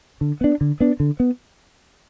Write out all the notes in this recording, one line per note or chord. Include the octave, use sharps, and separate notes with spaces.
D3
B3 D4
D3
B3 D4
D3
B3